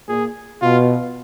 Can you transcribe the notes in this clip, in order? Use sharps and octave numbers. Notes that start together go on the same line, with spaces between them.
A#2 G#4
B2 F4